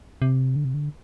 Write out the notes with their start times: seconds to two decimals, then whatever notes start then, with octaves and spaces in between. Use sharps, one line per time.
0.22 C3
0.56 D3
0.65 C3
0.74 D3